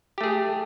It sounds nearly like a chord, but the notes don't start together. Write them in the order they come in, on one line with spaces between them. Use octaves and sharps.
G4 A3 G#4